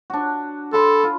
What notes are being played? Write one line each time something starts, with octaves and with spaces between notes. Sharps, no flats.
D4 F#4
A4 B5 C6
F4